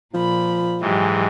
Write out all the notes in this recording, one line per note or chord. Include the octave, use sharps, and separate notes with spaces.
A#2 F3 B5
G#2 E3 F#3 G#3 G4